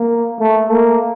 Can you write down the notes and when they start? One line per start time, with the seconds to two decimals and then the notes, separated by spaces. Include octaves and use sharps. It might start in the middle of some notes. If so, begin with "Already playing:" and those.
Already playing: A#3
0.40 A3
0.72 A#3